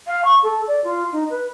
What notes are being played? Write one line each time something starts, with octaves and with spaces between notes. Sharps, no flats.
F5
C#6
A4
D5
F4
D#4
B4